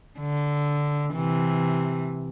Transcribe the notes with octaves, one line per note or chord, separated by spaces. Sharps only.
D3
C3 E3